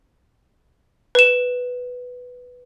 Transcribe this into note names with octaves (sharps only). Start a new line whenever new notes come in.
B4 E7